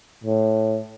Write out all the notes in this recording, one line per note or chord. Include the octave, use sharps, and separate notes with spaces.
A2